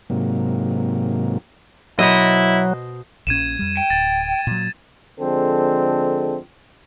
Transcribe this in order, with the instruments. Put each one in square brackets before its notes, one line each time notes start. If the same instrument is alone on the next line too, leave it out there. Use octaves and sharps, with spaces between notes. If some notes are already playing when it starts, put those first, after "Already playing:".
[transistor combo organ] G#2 C3 F#3 A#3
[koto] B2 C5 D#5 [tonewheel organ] F#3 [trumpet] E4
[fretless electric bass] A#1 A#2 C#4 [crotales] G#6 D#7 E7
[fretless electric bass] F2 G3
[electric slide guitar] G5
[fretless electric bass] D1 [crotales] A6
[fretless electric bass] A#2 F#3
[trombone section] D3 F3 G#3 C4 A4